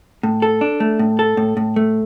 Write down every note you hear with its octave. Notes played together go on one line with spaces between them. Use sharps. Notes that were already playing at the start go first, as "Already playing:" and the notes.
A2
A4
D4
A3
A2
A4
A2
A2
A3